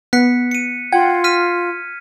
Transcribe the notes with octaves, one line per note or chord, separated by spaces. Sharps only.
B3 F#6 B6 C#7
C#7 D#7
F4 F#5 G5 G#6
F6 B6 D#7